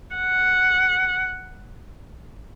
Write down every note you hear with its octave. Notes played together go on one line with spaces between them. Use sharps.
F#5